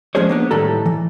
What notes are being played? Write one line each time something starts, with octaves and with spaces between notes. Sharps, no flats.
F3 G#3 C#4 G#4 C5 C#5
A#3 B3 D4
A2 D#3 E3 G3 A4 A#5
E3